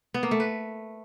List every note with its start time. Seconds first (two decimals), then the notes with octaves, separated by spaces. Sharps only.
0.14 B3
0.23 A#3
0.31 A3
0.40 B4